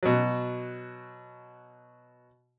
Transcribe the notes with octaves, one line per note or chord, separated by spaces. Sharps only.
B2 F#3